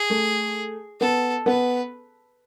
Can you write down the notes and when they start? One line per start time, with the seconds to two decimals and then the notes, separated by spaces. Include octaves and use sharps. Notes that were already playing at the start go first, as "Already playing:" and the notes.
Already playing: G#4
0.10 A3
1.00 B3 A4
1.46 B3 B4